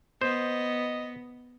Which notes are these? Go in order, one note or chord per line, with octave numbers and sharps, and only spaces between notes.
B3 C5 D#5